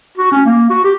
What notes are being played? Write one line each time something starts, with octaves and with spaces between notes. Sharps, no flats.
F#4
C#4
A#3
F#4
G4